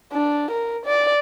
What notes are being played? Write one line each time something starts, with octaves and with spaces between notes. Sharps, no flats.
D4
A#4
D5